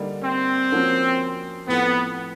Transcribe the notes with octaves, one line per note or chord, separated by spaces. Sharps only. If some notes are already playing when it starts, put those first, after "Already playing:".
Already playing: D3 G3 A#3 D#4
C4
F3 A#3 C#4 F#4
A2 F3 A3 B3 C4